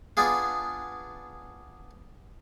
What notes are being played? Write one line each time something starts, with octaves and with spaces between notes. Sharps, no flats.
B3 D4 F4 G#4